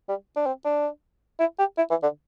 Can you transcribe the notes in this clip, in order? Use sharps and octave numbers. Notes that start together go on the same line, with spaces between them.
G3
D4
C4
D4
E4
G4
E4
E3
D3